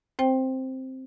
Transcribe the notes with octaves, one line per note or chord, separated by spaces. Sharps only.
C4 C5 G5